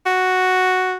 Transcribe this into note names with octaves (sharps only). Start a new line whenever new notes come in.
F#4